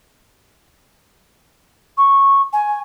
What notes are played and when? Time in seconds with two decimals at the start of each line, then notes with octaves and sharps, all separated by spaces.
1.97 C#6
2.53 G#5